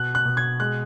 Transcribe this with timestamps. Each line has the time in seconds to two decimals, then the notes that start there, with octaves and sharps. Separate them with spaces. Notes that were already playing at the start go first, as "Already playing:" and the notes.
Already playing: B2 F#6
0.15 F#6
0.25 B2
0.37 G#6
0.60 G#3 F#6